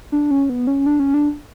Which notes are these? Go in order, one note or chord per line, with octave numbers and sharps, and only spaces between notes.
D4
C#4
B3
C#4
D4
C#4
D4